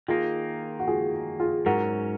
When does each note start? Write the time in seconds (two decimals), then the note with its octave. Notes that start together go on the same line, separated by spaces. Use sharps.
0.08 D#3 A#3 D#4 F4 G#4
0.79 F#4
0.87 F4 G#4
1.39 F4 G#4
1.66 G#2 F#3 C#4 F#4 A#4